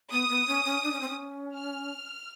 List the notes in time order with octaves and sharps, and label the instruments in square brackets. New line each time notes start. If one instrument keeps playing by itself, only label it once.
[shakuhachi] B3 [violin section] D#6
[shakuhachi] B3
C#4
C#4
D4
C#4
C4
C#4
[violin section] F6